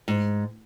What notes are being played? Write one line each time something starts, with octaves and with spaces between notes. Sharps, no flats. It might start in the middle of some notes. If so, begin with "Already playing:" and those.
G#2